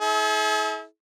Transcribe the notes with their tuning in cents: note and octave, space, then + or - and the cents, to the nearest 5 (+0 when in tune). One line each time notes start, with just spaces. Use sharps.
E4 -35 G#4 +45